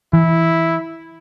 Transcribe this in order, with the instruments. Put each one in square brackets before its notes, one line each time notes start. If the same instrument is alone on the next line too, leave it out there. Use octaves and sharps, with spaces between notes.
[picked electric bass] E3 [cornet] E4